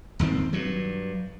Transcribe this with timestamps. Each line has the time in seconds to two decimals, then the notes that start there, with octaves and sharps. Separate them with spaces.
0.19 D#1 G#1 D#3 C4
0.53 G2 F#3